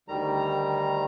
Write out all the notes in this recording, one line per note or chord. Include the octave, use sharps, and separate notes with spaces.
D2 D#3 G3 A#5